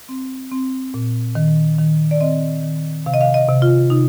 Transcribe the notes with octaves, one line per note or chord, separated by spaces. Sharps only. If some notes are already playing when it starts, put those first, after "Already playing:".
C4
C4
A#2
D#3
D#3
D5
C4 D#5
D#3
C3 F5
D#5
F5
D#5
C3
F4
C3 D#4